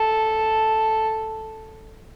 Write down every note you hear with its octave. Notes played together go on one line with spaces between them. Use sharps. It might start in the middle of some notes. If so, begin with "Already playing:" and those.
Already playing: A4